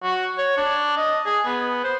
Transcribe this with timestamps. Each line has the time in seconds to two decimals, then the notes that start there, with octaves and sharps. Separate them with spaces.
0.03 F#4
0.38 C#5
0.57 D4
0.97 D#5
1.26 G#4
1.45 B3
1.84 C5